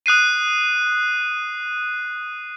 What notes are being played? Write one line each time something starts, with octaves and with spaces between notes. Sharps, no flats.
D#6 F#6 C7 D#7